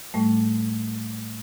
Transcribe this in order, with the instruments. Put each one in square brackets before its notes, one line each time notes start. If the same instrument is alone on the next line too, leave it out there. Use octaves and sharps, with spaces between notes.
[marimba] A2 G3 A3